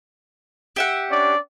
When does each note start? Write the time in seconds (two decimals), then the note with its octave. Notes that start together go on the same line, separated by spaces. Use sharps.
0.76 G4 E5 F#5
1.10 C#4 D4 D5